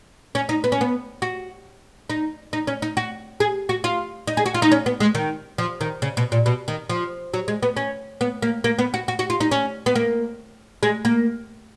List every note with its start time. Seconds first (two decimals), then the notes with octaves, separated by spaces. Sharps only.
0.35 C#4
0.49 D#4
0.64 B3
0.72 C#4
0.81 B3
1.22 F#4
2.10 D#4
2.53 D#4
2.67 C#4
2.82 D#4
2.97 F#4
3.40 G#4
3.69 F#4
3.84 F4
4.27 D#4
4.37 G#4
4.46 F#4
4.54 F4
4.62 D#4
4.72 C#4
4.86 B3
5.00 G#3
5.15 D#3
5.58 F3
5.81 D#3
6.02 C#3
6.17 B2
6.32 A#2
6.46 B2
6.68 D#3
6.90 F3
7.34 F#3
7.48 G#3
7.63 B3
7.77 C#4
8.21 B3
8.42 A#3
8.64 A#3
8.79 B3
8.94 F#4
9.08 F#4
9.19 F#4
9.30 F4
9.40 D#4
9.51 C#4
9.86 B3
9.96 A#3
10.83 G#3
11.05 A#3